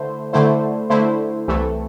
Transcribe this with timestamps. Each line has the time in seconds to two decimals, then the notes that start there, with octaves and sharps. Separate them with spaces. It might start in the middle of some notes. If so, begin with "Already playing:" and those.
Already playing: D3 A3 E4 C5
0.33 D3 A3 E4 C5
0.90 D3 A3 E4 C5
1.47 C2 C3 E3 A3